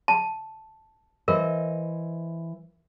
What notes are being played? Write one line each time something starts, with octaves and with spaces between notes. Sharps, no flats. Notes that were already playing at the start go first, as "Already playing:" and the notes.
A5
E3 A#4 C5 D#5